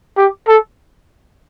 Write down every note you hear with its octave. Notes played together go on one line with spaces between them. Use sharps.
G4
A4